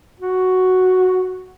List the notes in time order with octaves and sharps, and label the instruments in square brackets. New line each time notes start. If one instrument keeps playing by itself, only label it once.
[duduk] F#4